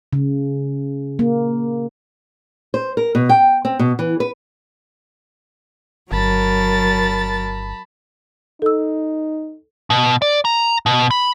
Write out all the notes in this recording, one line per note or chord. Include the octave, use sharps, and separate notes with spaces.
C#3
A#3
C5
A#4
B2
G5
C4
B2
E3
B4
G1 F#3 A#4 A5 B5 A6
D#4 A4 E6
B2
D5
A#5
B2
B5